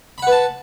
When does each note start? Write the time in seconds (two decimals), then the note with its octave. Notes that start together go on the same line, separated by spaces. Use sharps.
0.18 B5
0.22 F#5
0.27 B4
0.32 A5